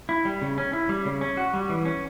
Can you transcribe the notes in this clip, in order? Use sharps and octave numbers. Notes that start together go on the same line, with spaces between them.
E4
G3
C#3
C#4
E4
G3
C#3
C#4
F#4
G3
E3
C#4